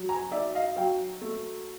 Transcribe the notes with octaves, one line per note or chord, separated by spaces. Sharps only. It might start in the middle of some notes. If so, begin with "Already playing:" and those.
Already playing: F#3
G#5 A#5
D#4 D5 E5
D#5 F5
F#3 F5 G5
A3